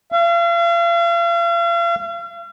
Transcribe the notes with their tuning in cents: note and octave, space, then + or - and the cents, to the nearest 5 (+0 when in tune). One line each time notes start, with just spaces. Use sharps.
F5 -40